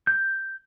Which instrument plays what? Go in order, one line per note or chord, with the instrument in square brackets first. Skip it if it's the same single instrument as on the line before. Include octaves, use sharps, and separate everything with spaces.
[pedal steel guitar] G6